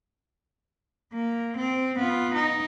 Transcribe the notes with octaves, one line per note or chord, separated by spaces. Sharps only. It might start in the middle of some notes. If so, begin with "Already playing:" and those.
A#3
C4
B3 F4
D#4